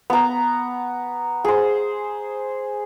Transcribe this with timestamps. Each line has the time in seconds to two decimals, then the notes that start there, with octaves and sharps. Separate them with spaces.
0.10 B3 A#5
1.45 G#4 C5